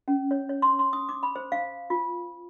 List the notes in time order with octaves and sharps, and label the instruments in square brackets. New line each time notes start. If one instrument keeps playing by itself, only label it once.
[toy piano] C#4
C#5
C#5
C6
C6
D#6
D6
B5
C5
F5
F4